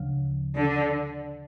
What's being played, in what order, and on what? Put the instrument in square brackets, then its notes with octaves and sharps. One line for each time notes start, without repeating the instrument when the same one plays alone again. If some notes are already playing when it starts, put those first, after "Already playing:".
Already playing: [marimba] D2 C#3 F3
[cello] D3